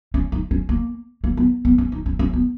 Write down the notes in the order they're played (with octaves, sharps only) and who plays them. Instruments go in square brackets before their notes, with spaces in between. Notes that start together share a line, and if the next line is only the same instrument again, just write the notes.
[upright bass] C#4
D#4
C#4
A#3
A#3
B3
B3
C#4
D#4
C#4
C#4
B3